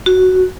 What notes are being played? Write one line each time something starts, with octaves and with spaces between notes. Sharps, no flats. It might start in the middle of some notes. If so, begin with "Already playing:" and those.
F#4